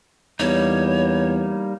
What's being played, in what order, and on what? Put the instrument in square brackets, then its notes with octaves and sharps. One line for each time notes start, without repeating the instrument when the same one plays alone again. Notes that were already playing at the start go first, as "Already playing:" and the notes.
[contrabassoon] E2 [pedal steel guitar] G3 A#3 D#4 [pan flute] C#5